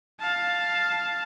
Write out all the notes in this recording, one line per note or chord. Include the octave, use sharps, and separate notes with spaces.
F5 A5